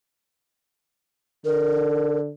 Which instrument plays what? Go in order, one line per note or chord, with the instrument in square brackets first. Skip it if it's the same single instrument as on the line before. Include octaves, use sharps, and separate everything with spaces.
[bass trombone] D3 [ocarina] A#4